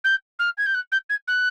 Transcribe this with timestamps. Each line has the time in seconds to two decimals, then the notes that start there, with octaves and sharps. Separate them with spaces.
0.04 G6
0.39 F6
0.57 G#6
0.66 G6
0.74 F#6
0.91 G6
1.09 G#6
1.27 F#6